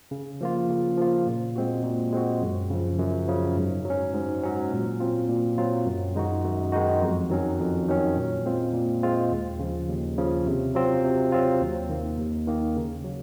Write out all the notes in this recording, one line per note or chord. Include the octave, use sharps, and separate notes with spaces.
C#3
F3 A#3 F4
C#3
F3 A#3 F4
A#2
G#3 C4 F#4
A#2
G#3 C4 F#4
F#2
C#3 F3
F#2
C#3 F3
G#2
F#3
C#4
G#2
F#3 C#4
A#2
F#3 C4 F4
A#2
F#3 C4 F4
F#2
D#3 G#3 D#4 F#4
F#2
D#3 G#3 D#4 F#4
F2
D#3 F#3 C#4
F2
D#3 F#3 C#4
A#2
G#3 C4 F4
A#2
G#3 C4 F4
D#2
C#3 F3
D#2
C#3 F3
C3
F#3 C4 F4
C3
F#3 C4 F4
D#2
D#3 A#3
D#2
D#3 A#3
C#3
F#3